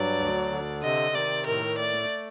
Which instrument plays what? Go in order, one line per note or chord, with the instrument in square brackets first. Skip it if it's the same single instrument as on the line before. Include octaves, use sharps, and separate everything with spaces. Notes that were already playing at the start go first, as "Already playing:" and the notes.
Already playing: [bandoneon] G2 F#3 [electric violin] D5
[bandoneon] D2
D3
[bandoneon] C3 [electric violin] D#5
[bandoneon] D#3 [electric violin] D5
[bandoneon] A2 [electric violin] A#4
[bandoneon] A3 [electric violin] D5